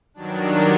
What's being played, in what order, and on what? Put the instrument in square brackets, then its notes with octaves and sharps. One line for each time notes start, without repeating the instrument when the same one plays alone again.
[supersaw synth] G2 D#3 F#3 D4